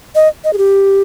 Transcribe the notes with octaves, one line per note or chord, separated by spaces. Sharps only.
D#5
D#5
G#4
G4